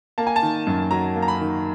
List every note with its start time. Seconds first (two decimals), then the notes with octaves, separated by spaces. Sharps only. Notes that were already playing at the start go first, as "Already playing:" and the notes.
0.18 A#3 A5
0.27 G#5
0.36 A5
0.42 D#3
0.67 F#2
0.91 F#3 A#5
1.16 A#3
1.22 A#5
1.28 B5
1.41 D#3